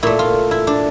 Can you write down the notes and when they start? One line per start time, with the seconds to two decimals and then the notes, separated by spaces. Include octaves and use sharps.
0.03 A#2 A3 E4
0.19 F4
0.51 E4
0.67 D4